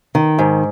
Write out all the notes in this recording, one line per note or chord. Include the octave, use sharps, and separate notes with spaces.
D#3
G#2